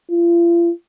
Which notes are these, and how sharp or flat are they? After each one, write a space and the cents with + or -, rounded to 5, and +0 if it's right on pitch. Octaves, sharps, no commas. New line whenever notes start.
F4 -40